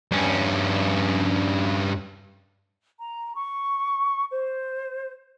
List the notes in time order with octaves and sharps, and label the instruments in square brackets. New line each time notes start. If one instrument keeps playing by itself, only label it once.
[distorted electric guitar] G2 C#4
[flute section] A#5
C#6
C5